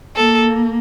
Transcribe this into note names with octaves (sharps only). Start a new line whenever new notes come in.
A#3 A4